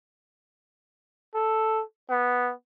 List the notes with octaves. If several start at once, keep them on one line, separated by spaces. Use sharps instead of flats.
A4
B3